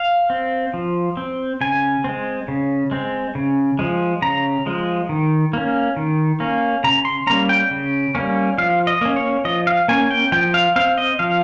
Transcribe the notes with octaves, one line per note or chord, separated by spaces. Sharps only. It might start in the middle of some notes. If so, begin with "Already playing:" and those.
Already playing: F5
C4
F3
C4
C#3 G#5
G#3 C4
C#3
G#3 C4
C#3
F3 G#3
C#3 A#5
F3 G#3
D#3
A#3 C#4
D#3
A#3 C#4
C#3 A#5
C6
G3 A#3 C#4 A#5
G5
C#3
G3 A#3 C#4
F3 F5
D#5
A#3 C#4
C#5
F3 D#5
F5
A#3 C#4 G#5
G5
F3 G5
F5
C4 F5
D#5
F3 F5